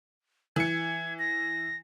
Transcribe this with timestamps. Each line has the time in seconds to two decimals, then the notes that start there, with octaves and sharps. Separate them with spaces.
0.56 E3 G#6 C#7
1.19 A#6